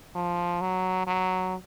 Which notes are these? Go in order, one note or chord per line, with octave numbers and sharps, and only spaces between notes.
F3
F#3
F#3